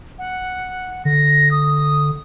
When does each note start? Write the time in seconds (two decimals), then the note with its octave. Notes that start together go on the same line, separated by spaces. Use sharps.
0.19 F#5
1.05 D3 A#6
1.51 D#6